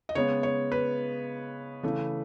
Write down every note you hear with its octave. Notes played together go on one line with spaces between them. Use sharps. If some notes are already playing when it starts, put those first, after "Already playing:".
D#5
C#3 G#3 B3 C#5
C#5
B4
C#3 E3 A3